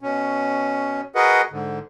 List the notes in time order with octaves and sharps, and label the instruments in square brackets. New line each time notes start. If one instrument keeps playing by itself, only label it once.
[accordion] B2 C#4
F#4 G#4 A#4 B4 D#5 F#5
G#2 D3